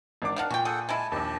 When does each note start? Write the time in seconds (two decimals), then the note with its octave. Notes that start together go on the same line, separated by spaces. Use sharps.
0.22 G#1 D4 D6
0.36 D#3 D4 F5 F#5 A5
0.50 A#2 F#4 G5
0.65 G#4 A4 F#5 G5
0.89 G#3 E4 G#5 A5
1.12 A#1 D#2 G4 A5